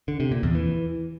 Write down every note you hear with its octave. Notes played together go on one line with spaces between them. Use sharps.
D3
C3
A#2
E2
E3